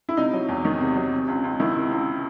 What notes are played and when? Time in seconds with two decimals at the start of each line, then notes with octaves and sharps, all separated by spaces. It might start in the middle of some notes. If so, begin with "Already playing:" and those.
0.09 E4
0.17 C3 D#4
0.33 F#3
0.48 E2
0.65 D#3
0.80 C3
0.96 F#3
1.12 C3
1.28 C#2
1.44 C#2
1.60 D#3 E4
1.75 C3
1.91 C#2